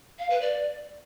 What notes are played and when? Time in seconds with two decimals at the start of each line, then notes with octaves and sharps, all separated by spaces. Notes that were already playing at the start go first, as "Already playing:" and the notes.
0.19 F5
0.30 B4
0.41 D5